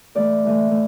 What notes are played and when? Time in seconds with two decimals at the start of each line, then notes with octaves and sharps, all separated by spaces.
0.15 A2 E3 A3 D5
0.45 A2 E3 A3
0.71 A2